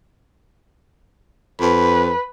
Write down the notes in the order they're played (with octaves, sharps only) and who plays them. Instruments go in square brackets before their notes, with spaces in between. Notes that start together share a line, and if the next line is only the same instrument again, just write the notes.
[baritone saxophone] F2 [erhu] B4